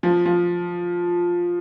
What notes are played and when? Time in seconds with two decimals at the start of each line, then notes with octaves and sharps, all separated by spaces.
0.03 F3
0.26 F3